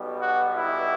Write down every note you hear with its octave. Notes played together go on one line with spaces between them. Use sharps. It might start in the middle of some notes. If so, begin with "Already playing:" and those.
Already playing: B1 B2 G3 B3
F#4
E4